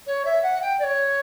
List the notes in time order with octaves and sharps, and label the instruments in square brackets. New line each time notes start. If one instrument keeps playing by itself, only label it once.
[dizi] C#5
E5
F#5
G5
D5
C#5